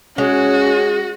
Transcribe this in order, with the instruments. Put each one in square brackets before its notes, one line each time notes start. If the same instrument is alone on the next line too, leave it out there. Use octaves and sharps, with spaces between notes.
[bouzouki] G#3 [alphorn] C#4 [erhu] F#4